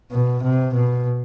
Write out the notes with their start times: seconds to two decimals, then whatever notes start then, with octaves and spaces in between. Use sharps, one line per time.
0.12 B2
0.43 C3
0.74 B2